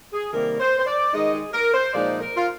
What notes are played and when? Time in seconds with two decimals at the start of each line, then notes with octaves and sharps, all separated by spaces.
0.13 G#4
0.32 C3 D#3 G3 A#3 A#4
0.60 C5
0.79 C5
0.86 D5
1.13 D#3 G#3 D#4 D#5
1.34 G#4
1.53 A#4
1.74 C5
1.93 A#2 F3 G#3 D#4 D5
2.21 A#4
2.36 F4